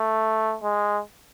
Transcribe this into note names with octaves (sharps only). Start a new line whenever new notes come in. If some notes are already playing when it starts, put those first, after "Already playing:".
Already playing: A3
G#3